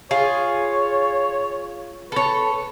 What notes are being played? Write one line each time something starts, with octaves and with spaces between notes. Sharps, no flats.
F4 G#4 C#5
A4 B4 C#5